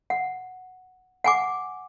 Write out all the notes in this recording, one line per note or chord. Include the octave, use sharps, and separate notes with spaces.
F#5
F#5 G#5 D6